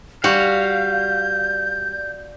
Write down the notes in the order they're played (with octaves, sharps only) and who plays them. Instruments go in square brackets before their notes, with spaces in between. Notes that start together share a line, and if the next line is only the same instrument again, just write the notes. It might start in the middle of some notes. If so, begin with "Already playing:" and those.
[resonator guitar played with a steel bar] G3 [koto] F#4 [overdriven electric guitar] F5 [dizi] G6